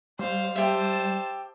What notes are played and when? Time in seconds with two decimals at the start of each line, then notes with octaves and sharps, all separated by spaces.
0.19 G3 C5 F5
0.56 G4 C5 E5 A5